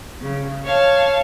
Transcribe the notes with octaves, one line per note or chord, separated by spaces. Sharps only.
C#3
C#5 F5 A5